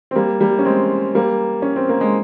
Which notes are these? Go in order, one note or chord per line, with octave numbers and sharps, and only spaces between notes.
C4
G3 A#3
G3 A#3
C#4
G#3 C4
G3 A#3
C#4
C4
A#3
G#3